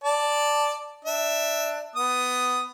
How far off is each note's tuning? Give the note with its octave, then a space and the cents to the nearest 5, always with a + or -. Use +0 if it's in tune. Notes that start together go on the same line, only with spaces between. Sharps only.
D5 +0 A5 +0
D4 +15 E5 +0
B3 +15 D#6 +0